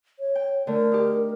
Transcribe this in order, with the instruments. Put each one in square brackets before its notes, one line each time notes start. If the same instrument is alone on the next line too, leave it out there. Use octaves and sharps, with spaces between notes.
[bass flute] C#5
[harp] G5
[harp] D3 A3 [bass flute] A#4
[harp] D#4 G4